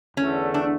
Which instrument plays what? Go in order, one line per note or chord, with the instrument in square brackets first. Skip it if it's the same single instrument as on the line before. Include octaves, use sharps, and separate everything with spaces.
[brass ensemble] E2 D3 A3 [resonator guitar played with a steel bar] C#4
[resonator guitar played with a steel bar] D4